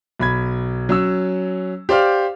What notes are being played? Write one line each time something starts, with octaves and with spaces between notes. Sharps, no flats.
B1 B5 G#6
F#3 C#4 E6
G4 C5 D5 F5 F6